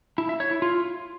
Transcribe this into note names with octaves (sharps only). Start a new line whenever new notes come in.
E4
E5
C#5
E4
F4